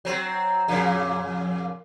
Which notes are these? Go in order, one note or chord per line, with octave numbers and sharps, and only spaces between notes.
F#3 C4
F2 A#2 C#3